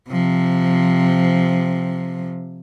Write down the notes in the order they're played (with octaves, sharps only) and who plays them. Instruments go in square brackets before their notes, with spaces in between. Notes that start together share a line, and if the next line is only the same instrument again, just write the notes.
[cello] C3 F3